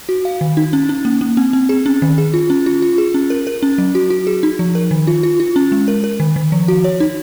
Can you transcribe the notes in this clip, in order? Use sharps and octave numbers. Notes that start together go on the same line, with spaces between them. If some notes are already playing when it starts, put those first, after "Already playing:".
F#4
F5
D#3
D#4
C#4
C#4
A#3
A#3
C4
C4
G#4
C#4
D#3
G#4
F4
C#4
F4
F4
G#4
C#4
A#4
A#4
C#4
F#3
F#4
F#4
G#4
D#4
F3
A#4
D#3
F4
F4
F4
C#4
G#3
A#4
A#4
D#3
D#3
F3
F#4
C#5
D#4